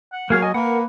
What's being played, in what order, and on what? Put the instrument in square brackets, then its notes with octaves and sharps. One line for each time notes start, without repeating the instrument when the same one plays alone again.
[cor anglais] F#5
[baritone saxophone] F#3 [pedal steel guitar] A#3 G#4 F6 [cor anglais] F5
[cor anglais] D#5 [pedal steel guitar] G#5
[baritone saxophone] A#3 [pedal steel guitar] A#4 F#5 [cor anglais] B4